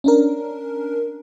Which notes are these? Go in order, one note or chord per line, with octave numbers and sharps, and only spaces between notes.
C#4 D4 A#4